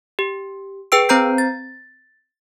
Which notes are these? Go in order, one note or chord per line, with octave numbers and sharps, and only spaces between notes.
G4
G#4 B4 G5 E6 D7
C4 C5 A#5 G6 C7
A6